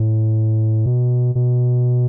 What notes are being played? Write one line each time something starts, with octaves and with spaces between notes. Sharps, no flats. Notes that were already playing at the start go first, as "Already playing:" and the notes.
Already playing: A2
B2
B2